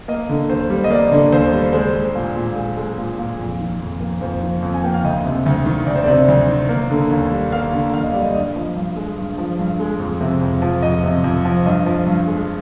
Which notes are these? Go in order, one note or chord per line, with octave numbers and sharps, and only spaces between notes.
A#3 D#5
D3
D#2 C5
G3
D#5
A#3 D5
D3
D#2 C5
G3
G#3 C5
G#3
A#2
A#2
G#3
G#3
A#2
A#2
F2
D#3
F2
A#3
F2 C5
D#3
F2
G#5
A#3 G5
F5
D2 D#5
C3
D2
D#3
D2 D5
C5
C3 D5
D2
D#3
A#3
D3
D#2
G3
A#3 F5
D3
D#2 F5
D#5
G3 D5
D#5
G2 D#5
F3
G2
G#3
G2
F3
G2
G#3
F2
C3
F2
F3
F2 D#5
C3
F2
F3
G2 D#5
F3
G2
G#3